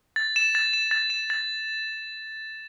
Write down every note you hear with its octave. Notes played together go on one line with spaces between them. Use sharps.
A6
E7
A6
E7
A6
E7
A6